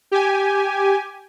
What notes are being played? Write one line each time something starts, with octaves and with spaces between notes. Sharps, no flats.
G4 G#5